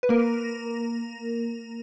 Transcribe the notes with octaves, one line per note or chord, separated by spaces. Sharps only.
B4
A#3 A#4